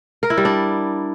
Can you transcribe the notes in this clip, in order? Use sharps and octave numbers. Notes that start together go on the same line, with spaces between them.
A#4
E4
G3
D4